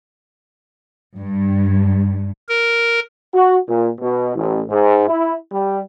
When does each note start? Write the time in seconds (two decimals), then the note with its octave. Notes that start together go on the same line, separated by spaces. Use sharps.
1.19 G2
2.49 A#4
3.34 F#4
3.69 A#2
4.01 B2
4.35 A1
4.70 G#2
5.07 E4
5.51 G3